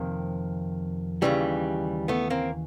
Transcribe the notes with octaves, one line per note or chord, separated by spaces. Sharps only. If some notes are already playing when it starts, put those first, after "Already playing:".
Already playing: F2 C3 D#3 A#3 C4
D#2 C#3 E3 G3
A3 B3
A#3 C4